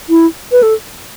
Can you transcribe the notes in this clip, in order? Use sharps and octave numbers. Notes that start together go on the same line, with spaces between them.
E4
B4
A4